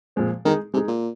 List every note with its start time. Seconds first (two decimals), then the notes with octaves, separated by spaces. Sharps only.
0.16 A#2 F3 G#3 C4
0.45 D#3 G#3 D#4 G#4
0.74 C3 G#3 D#4 G#4
0.88 A#2